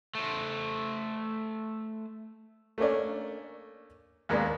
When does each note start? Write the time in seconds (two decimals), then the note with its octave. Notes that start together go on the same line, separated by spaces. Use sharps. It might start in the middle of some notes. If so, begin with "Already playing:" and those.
0.15 A3 C5
2.78 A3 A#3 C#4 D4
4.29 D#2 G#3 A#3 B3 D4